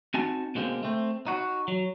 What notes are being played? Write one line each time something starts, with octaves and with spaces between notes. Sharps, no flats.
C4 D#4 F#4 G#5 A5
B2 D3 G#3 A#3 C4
A3 C4
D#4 F#4
F#3